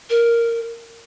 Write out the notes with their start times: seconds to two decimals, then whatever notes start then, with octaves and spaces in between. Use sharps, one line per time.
0.10 A#4